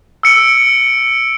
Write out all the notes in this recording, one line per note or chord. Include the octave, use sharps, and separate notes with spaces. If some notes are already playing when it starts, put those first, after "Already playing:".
E6 C#7 D7